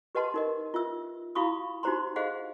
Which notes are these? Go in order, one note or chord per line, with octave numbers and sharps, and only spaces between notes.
G4 B4 D#5 F#5 A5 C6
D#4 A#4 D#5
F4 E5 E6
E4 F#4 F5 B5 C#6 D#6
D#4 F#4 G4 C5 A#5 C6
G#4 C5 D#5 F5 F#5